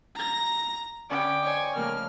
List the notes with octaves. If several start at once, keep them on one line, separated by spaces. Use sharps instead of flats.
A#5 A#6
D3 C#4 B4 G5 D6 D#6
C5 C#5 D#5 G#5 C#6
C#3 F3 A3 A#3 F6